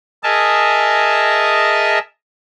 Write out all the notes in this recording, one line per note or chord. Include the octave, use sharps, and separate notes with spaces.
G#4 A#4 D#5 E5 A5